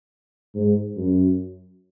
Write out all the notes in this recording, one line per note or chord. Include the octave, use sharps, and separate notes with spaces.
G#2
F#2